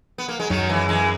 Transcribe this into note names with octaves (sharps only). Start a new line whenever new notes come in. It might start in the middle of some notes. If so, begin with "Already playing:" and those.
B3
A#3
G#3
F#2 D#3 F#3
E3 G#3
E3 G#3